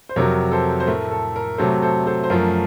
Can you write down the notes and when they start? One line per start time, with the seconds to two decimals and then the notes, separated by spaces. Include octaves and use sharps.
0.09 C5
0.16 F2 C3 F#3 A#4 C#5
0.52 A4 C5
0.80 C5
0.87 A2 A3 A#4
1.11 A4
1.36 A#4
1.58 C3 F#3 A3 A4 C5
1.82 A4 C5
2.07 A4 C5
2.24 C5
2.30 F#2 F3 A3 A#4